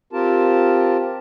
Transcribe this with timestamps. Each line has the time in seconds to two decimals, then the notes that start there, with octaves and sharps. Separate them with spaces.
0.13 C4 F4 G4 A#4 A5